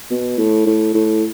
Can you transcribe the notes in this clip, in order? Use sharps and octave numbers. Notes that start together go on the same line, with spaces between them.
B2
A2
A2
A2